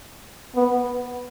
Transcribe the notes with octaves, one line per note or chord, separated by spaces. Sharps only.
B3